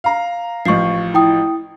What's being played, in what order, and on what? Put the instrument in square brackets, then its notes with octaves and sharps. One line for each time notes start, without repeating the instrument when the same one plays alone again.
[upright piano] F5 A#5
[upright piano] A1 F3 [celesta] C#6 C7
[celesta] E4 G5 D#6